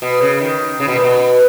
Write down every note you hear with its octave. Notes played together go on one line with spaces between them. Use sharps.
B2
C#3
D#3
C#3
B2
A#2
B2